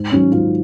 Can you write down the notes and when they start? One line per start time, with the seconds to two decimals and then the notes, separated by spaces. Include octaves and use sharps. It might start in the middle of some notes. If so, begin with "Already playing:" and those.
Already playing: G#2
0.12 D#3 F#3 C#4
0.32 G#2 F4